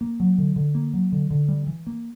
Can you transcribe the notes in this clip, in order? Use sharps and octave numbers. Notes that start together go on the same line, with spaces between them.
A#3
F#3
D3
D3
A#3
F#3
D3
D3
G3
E3
A#3